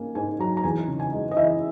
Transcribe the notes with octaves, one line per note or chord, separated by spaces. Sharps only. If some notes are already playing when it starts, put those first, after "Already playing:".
Already playing: G#2 A#3 C#4 G#5
G#2 G#5
F#3 A#5
A#5
E2 G#5
C#3
G#5
G#3
D#5
E3 E5